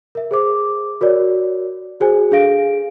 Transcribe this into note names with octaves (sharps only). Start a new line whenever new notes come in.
A#4 E5
G#4 C5 D6
F#4 A#4 C#5 D5
F#4 G#4 C5 G#5
D4 G#4 A4 F5 A#6 D7